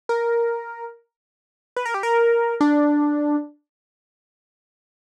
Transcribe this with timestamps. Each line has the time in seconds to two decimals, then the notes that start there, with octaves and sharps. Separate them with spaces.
0.09 A#4
1.76 B4
1.86 A#4
1.94 G4
2.03 A#4
2.61 D4